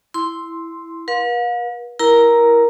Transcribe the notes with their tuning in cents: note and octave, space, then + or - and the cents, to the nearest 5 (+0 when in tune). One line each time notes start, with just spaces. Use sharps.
E4 +0 C6 +0
B4 -45 F5 +40
E4 +0 A#4 +15 A#5 +0